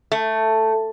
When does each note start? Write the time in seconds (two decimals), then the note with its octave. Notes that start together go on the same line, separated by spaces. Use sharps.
0.12 A3